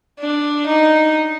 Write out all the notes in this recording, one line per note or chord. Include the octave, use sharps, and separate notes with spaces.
D4
D#4